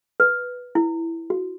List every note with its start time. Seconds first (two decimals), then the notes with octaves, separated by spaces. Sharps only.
0.20 B4
0.75 E4
1.30 F#4